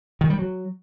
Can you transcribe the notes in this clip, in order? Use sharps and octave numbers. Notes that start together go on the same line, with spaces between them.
D#3
G3
F#3